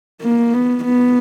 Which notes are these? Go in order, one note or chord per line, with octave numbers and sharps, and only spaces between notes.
A#3
B3
B3